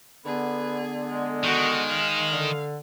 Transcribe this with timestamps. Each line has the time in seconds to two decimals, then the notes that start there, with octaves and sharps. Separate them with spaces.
0.25 D3 B3 G#4 B4
1.09 G#3
1.44 D#3 F#4
1.88 F5
2.31 D3